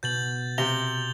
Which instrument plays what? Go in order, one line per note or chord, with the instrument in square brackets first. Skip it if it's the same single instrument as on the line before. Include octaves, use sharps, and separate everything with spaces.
[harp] B2 [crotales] G6 A6 F#7
[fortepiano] C3 [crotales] F7 G7